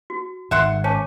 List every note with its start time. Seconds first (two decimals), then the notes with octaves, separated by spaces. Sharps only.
0.10 F#4
0.51 G#1 G#2 E5 F#5 C6
0.84 C#4 C#5 A5 D6